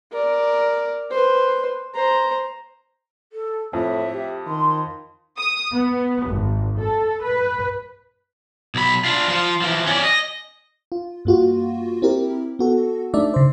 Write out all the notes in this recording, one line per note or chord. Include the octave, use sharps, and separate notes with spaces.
A#4 D5
B4 C5
C5 A#5
A4
F2 A2 E5
G4
D#3 C6
D#6
B3
G#1
A4
B4
B1 B5
D4 F4
F3 F4
E3 F3
C#4 D5
D#5
F4
G2 A#3 F4 F#4
C4 E4 G4 A#4
B3 F#4 A4
A3 D4 D#4 D5 E5
C#3 C5